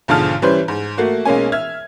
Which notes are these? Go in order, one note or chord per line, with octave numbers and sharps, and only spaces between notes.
B1 G#2 D3 F3 A5 F6
E3 G3 C#4 B4 C5
G#2
A3 A#3 F#4
B1 G#3 A#3 C#4 G#5
E5 F6 G#6